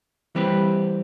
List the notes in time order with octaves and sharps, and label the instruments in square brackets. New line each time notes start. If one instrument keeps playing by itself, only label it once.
[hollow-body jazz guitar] E3 G3 C4 G4 B4